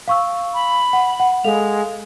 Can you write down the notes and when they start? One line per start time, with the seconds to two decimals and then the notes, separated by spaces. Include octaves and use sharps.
0.08 F5 C#6 E6
0.54 B5
0.93 F#5
1.20 F#5
1.44 G#3 A4 F5 F7